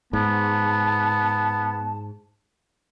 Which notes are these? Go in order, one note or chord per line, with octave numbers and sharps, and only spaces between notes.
G#2 B3 A5